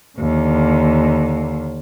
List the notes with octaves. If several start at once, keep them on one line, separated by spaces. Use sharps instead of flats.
D#2 D3